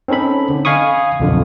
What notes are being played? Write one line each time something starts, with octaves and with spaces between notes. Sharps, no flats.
C4 C#4 D#4 A4 B5
D3
D#5 F5 G#5 B5 C#6 D#6
B1 F2 D3